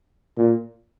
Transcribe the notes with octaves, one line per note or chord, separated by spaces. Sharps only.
A#2